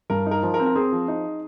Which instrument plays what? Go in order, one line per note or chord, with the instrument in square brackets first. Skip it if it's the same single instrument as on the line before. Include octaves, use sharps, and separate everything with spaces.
[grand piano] G2 [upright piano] A#4
[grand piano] D#4
[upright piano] A#4
[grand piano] F3
[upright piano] A#4
[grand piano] C4
[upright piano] A#4
[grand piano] C4 [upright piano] G#4
[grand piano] F3
D#4